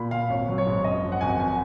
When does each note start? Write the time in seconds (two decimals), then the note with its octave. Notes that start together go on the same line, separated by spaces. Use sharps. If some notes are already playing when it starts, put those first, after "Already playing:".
Already playing: A#2 A#3 B5
0.11 A#2 F5
0.30 G#1 C#5
0.49 F#3
0.58 C#5
0.67 G#2
0.84 F#2 D#5
1.04 F3
1.12 F#5
1.21 G#1 G#5
1.30 F#5
1.40 G#5